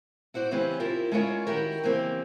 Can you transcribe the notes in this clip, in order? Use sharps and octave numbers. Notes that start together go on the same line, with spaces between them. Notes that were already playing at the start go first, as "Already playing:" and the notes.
E4 F#4 C5 D5
C#3 E3 C4 C#4 G4 B4
E4 F4 G4 A#4 E5
G#3 C#4 E4 F4 A#4 C#5
D#3 E4 F#4 G4 A#4
C#3 E3 A#3 C4 G4 A#4